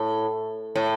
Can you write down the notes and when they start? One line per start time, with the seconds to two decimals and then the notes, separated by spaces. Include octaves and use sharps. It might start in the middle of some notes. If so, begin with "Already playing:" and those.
Already playing: A2
0.76 A2